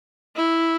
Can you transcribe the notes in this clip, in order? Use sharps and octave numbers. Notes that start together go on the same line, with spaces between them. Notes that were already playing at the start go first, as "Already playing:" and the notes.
E4